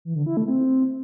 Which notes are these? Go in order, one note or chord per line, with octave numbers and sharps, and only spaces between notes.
E3
D3
E4
A3
C4